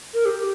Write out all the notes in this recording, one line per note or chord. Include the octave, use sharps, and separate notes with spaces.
A#4
G4